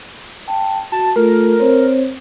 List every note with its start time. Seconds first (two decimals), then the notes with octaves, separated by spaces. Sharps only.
0.48 G5 A5
0.92 F#4 A5
1.16 A3 F4 A4 A#4
1.59 C4 C5 C#5